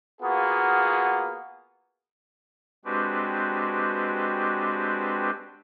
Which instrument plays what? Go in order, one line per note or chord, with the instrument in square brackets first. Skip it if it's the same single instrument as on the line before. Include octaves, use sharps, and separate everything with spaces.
[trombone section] A#3 B3 F4 F#4 G#4
[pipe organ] G#3 C4 D4 F#4 G4 B4